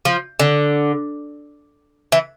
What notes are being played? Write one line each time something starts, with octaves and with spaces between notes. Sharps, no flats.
F3
D3
E3